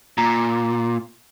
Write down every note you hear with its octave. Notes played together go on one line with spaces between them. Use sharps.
A#2 A#5